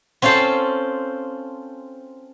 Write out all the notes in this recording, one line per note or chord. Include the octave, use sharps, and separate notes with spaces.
C4 C#4 F4 A4 C5